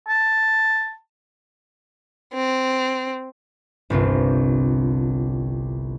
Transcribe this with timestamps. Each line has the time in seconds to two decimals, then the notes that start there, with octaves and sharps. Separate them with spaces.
0.08 A5
2.33 C4
3.90 G1 C2 C4 F4